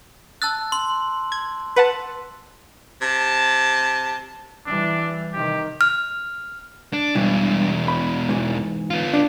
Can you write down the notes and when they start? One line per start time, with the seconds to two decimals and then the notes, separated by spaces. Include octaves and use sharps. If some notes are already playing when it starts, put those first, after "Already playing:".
0.42 A5 E6 F#6 A6
0.72 C6 F#7
1.32 G#6
1.76 B4 F#5 A5
3.02 C3 A5
4.67 E3 G3 D4
5.33 C3 D#3 G4
5.81 F6
6.93 D4
7.15 E2 G2 B2 E3
7.88 B5
8.29 G#2 E3
8.90 B3 F4
9.13 D4